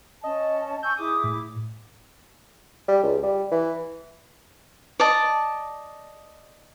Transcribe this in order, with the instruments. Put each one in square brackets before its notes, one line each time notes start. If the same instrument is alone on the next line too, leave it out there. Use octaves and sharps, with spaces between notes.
[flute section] C#4 A5 [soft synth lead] D#5
[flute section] G#5 C#6 E6 [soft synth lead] G6
[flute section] E4 G#4 D6 [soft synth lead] D#6
[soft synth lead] A2
[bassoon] G3
C#2
G3
E3
[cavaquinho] D5 D#5 A5